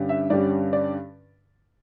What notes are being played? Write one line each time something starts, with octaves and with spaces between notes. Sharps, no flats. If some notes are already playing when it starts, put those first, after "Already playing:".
Already playing: G2 D3 G3 C#4
E5
G2 D3 G3 C#4 D5
D5